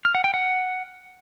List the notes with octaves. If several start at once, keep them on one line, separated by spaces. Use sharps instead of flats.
F6
F#5
G5
F#5